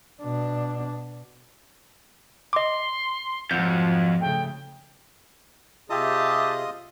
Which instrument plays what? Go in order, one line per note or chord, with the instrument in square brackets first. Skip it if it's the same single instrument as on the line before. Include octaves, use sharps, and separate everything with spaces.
[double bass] B2 D4
[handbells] D#5 D6 [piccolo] C6
[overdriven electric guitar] F2 [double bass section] G#2 F3 F#3 [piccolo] F#5 [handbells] G6
[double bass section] C#3 A3 [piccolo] G5
[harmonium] C3 G#4 [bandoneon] F4 D#5 D#6 [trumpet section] G4 E5 A5